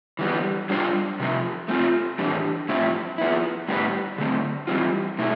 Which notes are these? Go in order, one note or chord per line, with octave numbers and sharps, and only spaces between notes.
E3 G3 B3
G3 D4 F4 C5
C3 F3 A3
A3 C4 F4
A2 E3 A3 D4 G4
A2 F3 C4 E4
F3 B3 E4
A2 G3 B3 E4 B4
D3 A3 C4
E3 G3 C4 F4
B2 A3 E4